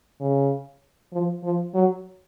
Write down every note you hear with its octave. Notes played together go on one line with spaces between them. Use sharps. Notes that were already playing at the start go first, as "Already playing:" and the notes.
C#3
F3
F3
F#3